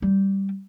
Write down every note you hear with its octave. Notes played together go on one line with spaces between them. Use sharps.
G3